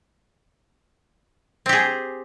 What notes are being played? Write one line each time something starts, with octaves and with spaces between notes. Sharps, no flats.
C4 G4 G#4